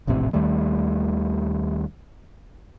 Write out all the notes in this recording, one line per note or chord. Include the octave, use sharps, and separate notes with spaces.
E1 A#1 A2 C3
D#2 D#3 G3 A3